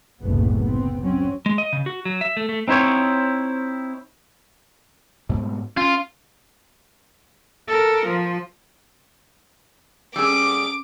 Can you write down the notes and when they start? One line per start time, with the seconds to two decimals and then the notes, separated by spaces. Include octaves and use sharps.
0.22 F#1 C2 A2 A3 B3
0.61 B3 C4
1.01 F#3 C4 C#4
1.46 G#3
1.58 D#5
1.73 C#3
1.86 F#4
2.05 F#3
2.21 E5
2.37 A3
2.49 A3
2.68 C4 D#4 E4 C5 C#5
5.29 G#2 B2 G3
5.77 C#4 F4
7.68 A4 A#4
8.06 F3
10.16 G3 C#4 G#4 D6 E6